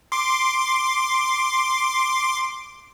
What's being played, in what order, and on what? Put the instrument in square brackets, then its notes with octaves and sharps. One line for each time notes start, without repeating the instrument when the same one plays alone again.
[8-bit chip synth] C6 D6